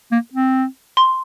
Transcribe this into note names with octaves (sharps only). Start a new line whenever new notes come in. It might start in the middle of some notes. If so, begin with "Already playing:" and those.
A#3
C4
C6